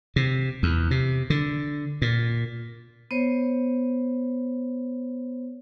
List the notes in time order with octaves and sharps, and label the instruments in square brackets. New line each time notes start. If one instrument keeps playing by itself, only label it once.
[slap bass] C3
E2
C3
D3
A#2
[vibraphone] B3 C5 C#5